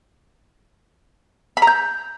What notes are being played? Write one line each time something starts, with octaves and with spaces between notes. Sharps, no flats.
B5
A#5
G6